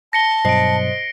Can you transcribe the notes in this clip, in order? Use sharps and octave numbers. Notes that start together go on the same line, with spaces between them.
A5 A#6 C#7 G7
G2 B2 F#3 C5 D#5 C7 D7